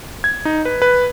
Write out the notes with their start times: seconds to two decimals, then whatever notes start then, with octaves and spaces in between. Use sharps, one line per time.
0.24 G#6
0.45 D#4
0.65 B4
0.82 B4